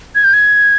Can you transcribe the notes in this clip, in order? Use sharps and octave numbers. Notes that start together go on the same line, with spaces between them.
G#6
G6
G#6